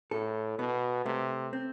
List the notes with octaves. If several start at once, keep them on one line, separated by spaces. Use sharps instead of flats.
A2 A4
B2 B3
C3 A3
C4